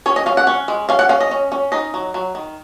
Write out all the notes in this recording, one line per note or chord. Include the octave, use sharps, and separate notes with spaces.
C#4 C#5
D#5
C#4 F5
F#5
C#4
G#3
C#4 F5
F#5
C#4 F5
D#5
C#4
C#4
D#4 D#5
F#3
F#3
D#3